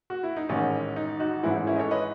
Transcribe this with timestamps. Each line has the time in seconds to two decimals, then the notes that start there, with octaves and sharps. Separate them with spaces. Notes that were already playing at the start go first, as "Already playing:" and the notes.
0.10 F#4
0.23 E4
0.36 D#4
0.49 A1 G#2 D#3 C#4
0.96 D#4
1.20 D#4 F#4
1.43 G#1 G#2 E3 C#4 E4
1.55 D#4
1.67 C#4 E4
1.76 D#5
1.79 A4 C#5
1.91 B4 D#5